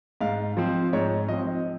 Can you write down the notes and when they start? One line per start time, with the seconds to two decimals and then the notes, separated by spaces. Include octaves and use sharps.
0.21 G#2 F5
0.57 F3 C4
0.93 G#2 C#5
1.28 F3 C4 D#5